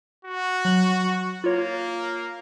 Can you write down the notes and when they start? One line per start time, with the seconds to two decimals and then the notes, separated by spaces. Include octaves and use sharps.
0.25 F#4
0.65 F#3 F#6 F#7
1.44 A#3 F4 C#5